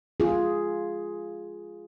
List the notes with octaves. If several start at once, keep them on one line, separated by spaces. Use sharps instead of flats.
F4 G#4